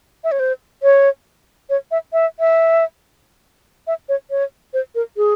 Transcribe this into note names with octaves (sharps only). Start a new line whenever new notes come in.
E5
C#5
C5
C#5
C#5
E5
E5
E5
E5
C#5
C#5
C5
A#4
G#4